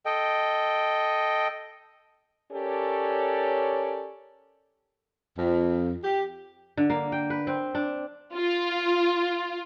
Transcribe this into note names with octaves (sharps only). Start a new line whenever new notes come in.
A4 D#5 G5
C#4 G4 A4 A#4 C#5 D5
F2
G4
D3
A#3
G5
B4
C4
D4
F4